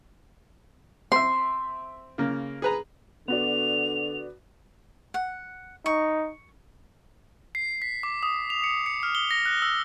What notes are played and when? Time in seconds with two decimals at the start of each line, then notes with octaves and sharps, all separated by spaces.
1.12 C4 E5 C6
2.18 C#3 A#3
2.62 G#4 B4 A#5
3.28 D3 B3 F#4 D5 F7
5.14 F#5
5.86 D#4 C#6
7.55 C7
7.82 B6
8.03 D6
8.23 D#6
8.50 F7
8.64 C#7
8.86 C#7
9.03 F6
9.15 G7
9.31 A#6
9.46 F#6
9.62 E6